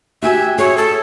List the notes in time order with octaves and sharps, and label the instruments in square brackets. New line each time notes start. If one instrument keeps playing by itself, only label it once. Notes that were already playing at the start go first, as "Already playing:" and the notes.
[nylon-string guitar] F#4 G4 G#5 [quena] E5
[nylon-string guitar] G#4 [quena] C#5
[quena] A4